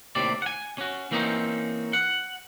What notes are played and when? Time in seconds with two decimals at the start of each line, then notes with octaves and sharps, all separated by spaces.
0.15 D#2 A2 C3 C4 D5
0.42 F#5 G#5
0.78 C#4 F#4
1.11 E3 A#3 C4 C#4 D#4
1.93 F#5